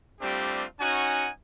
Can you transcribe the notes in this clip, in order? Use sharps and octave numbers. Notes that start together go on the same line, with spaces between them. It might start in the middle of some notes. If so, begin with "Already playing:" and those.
G3 A3 C4 D4 F4 G4
C#4 D#4 F#4 F#5 G#5